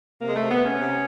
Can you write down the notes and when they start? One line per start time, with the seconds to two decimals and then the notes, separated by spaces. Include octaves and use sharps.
0.21 C3 A#3
0.29 G#3
0.36 A3
0.41 C3
0.51 B3
0.60 C3
0.66 C#4
0.80 C3